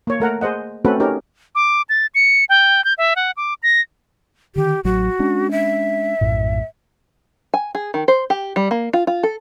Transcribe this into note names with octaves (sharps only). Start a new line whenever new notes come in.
A#3 C#5
A3 A#4 F#5 A#5
G#4 C5 D#5 F#5
A3 C4 C#4 F#4 A4 B4
C#4 D#4 G4 A#4
D6
A6
C#7
G5
G6
E5
F#5
D6
A#6
D3 D#3 G4
A1 F#3 F#4
G#3 C#4 D4
E5
A#1 F#2 A2
G#5
G#4
D#3
C5
G4
G3
A#3
F4
F4
A4